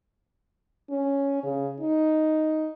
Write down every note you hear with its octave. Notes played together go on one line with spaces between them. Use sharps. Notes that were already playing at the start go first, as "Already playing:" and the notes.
C#4
C#3
D#4